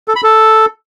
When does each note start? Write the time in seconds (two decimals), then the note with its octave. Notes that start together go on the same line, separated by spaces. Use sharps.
0.08 A4
0.16 B5
0.24 A4